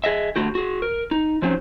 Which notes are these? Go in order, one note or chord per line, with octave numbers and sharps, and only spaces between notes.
G#4 D#5 E5
D3 A3 F#4 G4
F#4 G#4
A#4
D#4
F3 F#3 C4 C#4 D#4